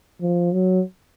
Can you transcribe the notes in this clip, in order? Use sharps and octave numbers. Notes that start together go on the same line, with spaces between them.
F3
F#3